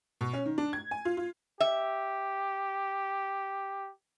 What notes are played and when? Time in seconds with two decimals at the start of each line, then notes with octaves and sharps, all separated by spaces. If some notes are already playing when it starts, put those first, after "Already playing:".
0.21 B2
0.33 C#4
0.46 D#3
0.58 D4
0.73 G#6
0.91 G#5
1.05 F4
1.17 F4
1.60 G4 E5